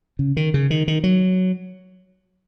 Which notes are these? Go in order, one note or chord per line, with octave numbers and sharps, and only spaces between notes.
C#3
D#3
C#3
D#3
D#3
F#3